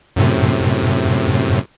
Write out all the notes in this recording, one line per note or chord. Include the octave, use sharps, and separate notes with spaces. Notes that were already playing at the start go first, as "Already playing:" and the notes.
F#2 A2 C3